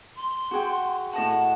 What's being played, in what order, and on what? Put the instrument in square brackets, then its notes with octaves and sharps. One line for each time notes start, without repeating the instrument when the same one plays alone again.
[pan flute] C6
[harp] F#4 G#4 G5
[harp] A2 D#5 F#5 [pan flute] A5